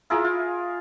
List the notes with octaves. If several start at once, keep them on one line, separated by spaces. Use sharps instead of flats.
E4 F4 G#4 A#4
F4